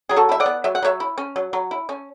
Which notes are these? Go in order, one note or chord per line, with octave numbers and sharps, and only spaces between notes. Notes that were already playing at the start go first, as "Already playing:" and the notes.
F#3 G#4
F#4 A4
E4 E5
D5 F#5
B3
F#3 E5
F#5
F#3 C#5 E5
E4
C#4
F#3
F#3
E4
C#4